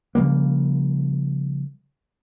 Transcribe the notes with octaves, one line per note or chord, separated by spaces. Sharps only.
C#3 F3 G3 A#3